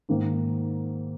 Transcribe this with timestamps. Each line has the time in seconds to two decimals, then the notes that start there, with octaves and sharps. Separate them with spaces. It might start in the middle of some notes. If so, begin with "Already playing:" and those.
0.09 G#2 D#3 A#3